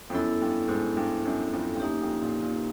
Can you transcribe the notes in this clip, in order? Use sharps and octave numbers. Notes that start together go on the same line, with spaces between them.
F2
F#2 B3 E4 A4
G2
G#2
G2
F#2
F2
G2
F#2 A#3 D#4 G4
F2
A#2
A#2